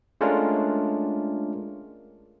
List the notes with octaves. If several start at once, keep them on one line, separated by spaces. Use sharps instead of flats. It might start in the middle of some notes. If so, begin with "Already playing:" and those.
G#3 A3 C#4 D4 F4 A#4